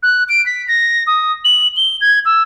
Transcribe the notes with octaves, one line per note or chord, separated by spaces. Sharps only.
F#6
D7
B6
A#6
D#6
F#7
G7
G#6
E6